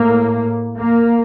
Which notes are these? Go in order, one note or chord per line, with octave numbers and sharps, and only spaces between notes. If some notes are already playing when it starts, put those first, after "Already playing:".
Already playing: A2 A#3
A#3